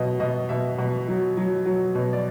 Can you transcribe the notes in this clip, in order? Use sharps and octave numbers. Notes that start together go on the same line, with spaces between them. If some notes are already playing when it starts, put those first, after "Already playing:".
Already playing: B2 F#3 D#5
B2 D#5
B2 E5
B2
F#3
F#3
F#3
B2
D5